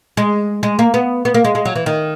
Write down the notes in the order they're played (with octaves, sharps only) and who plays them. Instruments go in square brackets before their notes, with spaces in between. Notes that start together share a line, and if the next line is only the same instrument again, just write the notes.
[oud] G#3
G#3
A#3
B3
B3
A#3
G#3
G#3
F#3
E3
D#3